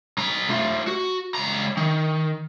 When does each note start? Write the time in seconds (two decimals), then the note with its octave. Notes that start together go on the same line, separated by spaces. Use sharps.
0.18 B2 A#5
0.50 A3 F4
0.88 F#4
1.35 C#2 A#5
1.77 D#3